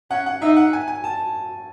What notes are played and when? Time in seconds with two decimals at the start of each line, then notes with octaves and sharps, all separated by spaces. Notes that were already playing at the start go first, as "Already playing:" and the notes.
0.11 C#4 F#5
0.26 F#5
0.41 D#4 E5
0.56 F#5
0.73 G#5
0.88 G#5
1.04 A5